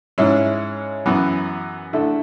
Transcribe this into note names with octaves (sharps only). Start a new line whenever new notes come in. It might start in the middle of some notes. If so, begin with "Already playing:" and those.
G#2 G#3 C#4 E4 G#4
F#2 E3 B3
D3 A3 E4